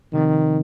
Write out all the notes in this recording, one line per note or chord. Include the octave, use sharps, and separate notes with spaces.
C3 D#3 F3 C4